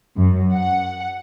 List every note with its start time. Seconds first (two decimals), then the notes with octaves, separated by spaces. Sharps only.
0.17 F#2
0.53 F#5